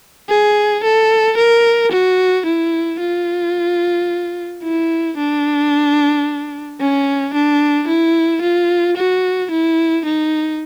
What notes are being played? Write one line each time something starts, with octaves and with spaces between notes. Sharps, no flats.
G#4
A4
A#4
F#4
E4
F4
E4
D4
C#4
D4
E4
F4
F#4
E4
D#4